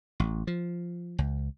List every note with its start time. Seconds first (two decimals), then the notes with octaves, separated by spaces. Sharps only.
0.20 A1
0.47 F3
1.19 C#2